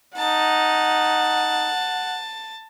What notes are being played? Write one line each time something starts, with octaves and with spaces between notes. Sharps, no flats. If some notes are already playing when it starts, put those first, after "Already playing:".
D#4 F#5 A5